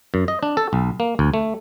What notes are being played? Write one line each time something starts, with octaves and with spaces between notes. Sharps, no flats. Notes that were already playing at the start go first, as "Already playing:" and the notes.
F#2
D#5
D4
A4
B1
A#3
D2
A3